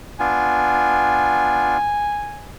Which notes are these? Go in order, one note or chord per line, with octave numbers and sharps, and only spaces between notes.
B3 D4 F4 G#5